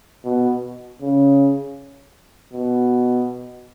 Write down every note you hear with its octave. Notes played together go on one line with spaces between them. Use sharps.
B2
C#3
B2